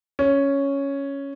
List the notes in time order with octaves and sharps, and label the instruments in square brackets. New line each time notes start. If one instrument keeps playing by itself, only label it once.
[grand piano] C#4